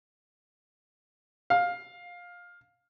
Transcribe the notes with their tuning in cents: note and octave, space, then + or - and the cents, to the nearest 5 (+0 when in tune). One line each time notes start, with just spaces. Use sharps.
F5 +15